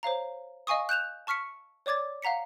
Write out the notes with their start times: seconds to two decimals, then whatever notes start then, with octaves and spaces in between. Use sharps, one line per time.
0.03 C5 C#5 F5 A#5
0.67 D#5 F5 G#5 C#6 D#6
0.89 F#6 G6 E7 F7
1.27 A5 C#6 F6 B6 C#7
1.86 C#5 D5 D6 G#6 A6
2.22 F5 F#5 A#5 B6 C#7